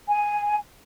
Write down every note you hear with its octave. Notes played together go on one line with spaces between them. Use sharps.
G#5